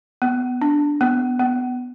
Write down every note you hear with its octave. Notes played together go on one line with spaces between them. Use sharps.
B3
D4
B3
B3